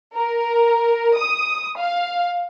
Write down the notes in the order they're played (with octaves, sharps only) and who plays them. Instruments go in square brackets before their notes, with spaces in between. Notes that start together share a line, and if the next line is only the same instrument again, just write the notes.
[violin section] A#4
D#6
F5